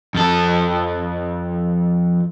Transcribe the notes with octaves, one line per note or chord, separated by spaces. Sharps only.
F2 A4